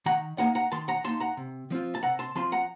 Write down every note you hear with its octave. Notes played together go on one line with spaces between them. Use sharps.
D#3 F#5 A#5
A#3 D#4 F#5 A#5
F#5 A#5
D#3 A5 C6
F#5 A#5
A#3 D#4 A5 C6
F#5 A#5
C3
F3 C4 F4
A5
C3 F#5 A#5
A5 C6
F3 C4 F4 A5 C6
F#5 A#5